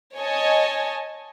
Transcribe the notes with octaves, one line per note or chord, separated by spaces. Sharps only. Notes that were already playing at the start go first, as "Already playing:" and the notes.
C#5 D#5 G#5 A5